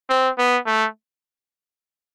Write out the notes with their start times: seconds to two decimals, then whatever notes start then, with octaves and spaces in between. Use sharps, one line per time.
0.09 C4
0.38 B3
0.66 A3